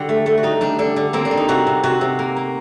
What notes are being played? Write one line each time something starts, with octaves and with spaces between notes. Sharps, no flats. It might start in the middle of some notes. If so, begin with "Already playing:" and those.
Already playing: D3 G3 F#4
A3
A3
F#4
G3 D#4
G3 D4
D3 D4
D3
A#3 C4
D4
G3
D#4
C3 F#4
C3
C3 F#4
C3
A#3
A#3